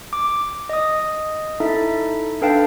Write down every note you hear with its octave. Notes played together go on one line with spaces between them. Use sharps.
D6
D#5 D#6
D#4 E4 A4 E5
D4 A4 B4 F5 G5 A5